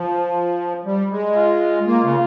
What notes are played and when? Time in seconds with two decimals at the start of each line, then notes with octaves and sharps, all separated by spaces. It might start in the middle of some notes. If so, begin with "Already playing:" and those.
Already playing: F3
0.86 G3
1.11 G#3
1.36 F4
1.87 A#3
2.03 C#3